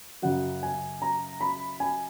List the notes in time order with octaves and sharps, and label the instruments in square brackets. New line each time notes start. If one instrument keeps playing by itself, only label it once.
[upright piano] F#2 C#3 F#3 F#5
G#5
A#5
B5
G#5